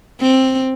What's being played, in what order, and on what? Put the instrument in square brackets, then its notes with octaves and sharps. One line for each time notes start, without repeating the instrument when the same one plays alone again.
[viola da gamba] C4